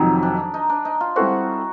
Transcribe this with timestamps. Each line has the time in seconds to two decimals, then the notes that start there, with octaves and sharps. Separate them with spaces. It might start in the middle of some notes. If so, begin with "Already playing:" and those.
Already playing: F2 C3 D#3 F#3 D#4
0.23 D4
0.54 D#4
0.69 D4
0.85 D#4
1.01 F4
1.16 G3 C4 E4 F#4 A4 C5